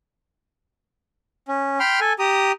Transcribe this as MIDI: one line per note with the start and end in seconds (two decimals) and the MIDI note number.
1.48 1.79 61
1.80 2.00 79
1.80 2.00 83
1.80 2.00 84
1.80 2.00 89
2.01 2.13 69
2.01 2.13 80
2.19 2.52 67
2.19 2.52 82
2.19 2.52 87